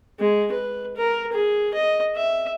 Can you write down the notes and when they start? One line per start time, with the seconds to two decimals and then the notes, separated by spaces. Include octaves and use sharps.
0.20 G#3
0.52 B4
0.97 A#4
1.33 G#4
1.74 D#5
2.16 E5